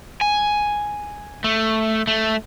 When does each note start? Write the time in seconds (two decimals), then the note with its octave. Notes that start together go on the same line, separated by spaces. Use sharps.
0.21 G#5
1.44 A3
2.07 A3